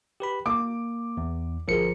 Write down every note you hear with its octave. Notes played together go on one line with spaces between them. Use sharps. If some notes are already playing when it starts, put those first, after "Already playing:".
G4 B4 B5
A#3 D6
E2
G1 F3 G#4 A#4 C#7